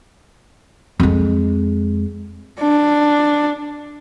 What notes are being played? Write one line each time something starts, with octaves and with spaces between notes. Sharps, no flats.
F2 G#3
D4